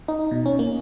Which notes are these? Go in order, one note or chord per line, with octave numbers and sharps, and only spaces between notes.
D#4
B2
C#4
A#3